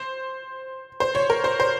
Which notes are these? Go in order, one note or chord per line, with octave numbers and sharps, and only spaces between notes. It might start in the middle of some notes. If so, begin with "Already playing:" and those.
Already playing: C5
C5
C#5
A#4
C5
C5